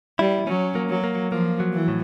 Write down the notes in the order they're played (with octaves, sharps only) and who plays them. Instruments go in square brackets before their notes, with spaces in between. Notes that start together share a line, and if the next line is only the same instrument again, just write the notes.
[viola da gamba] G3 [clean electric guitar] E4
[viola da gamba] F#3 [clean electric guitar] C#4
[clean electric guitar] A#3
[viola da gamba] F#3
[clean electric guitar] A#3
[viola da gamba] F3 [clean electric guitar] A#3
[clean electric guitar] F#3
[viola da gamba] E3
[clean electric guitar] A2